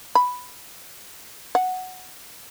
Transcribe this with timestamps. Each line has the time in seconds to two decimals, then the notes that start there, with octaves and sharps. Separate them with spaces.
0.15 B5
1.55 F#5